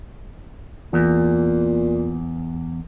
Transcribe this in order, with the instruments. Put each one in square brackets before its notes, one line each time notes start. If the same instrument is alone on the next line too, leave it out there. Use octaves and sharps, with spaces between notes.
[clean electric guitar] E2 [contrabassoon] A#2